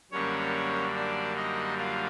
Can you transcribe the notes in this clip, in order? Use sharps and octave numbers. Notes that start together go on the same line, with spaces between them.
F#2 D3 G3 A#3 C#4 C#5
D4 D5
D#4 D#5
F4 F5